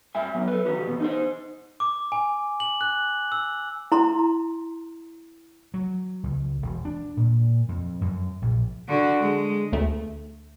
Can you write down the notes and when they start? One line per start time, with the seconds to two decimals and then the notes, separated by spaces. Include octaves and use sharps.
0.15 G2 E5 G#5
0.35 F#3 B3
0.48 A4 B4
0.66 D#3 E3 F#4 G4
0.83 E2 B2
1.00 D#4 A4 C5
1.80 D6
2.12 G#5
2.60 F#7
2.81 F#6
3.32 E6
3.92 E4 A#5 C6
5.74 F#3
6.23 C#2
6.62 E1
6.85 D4
7.17 A#2
7.69 F2
8.01 F#2
8.42 A#1
8.88 D3 F#4
9.20 G#3
9.73 D2 A3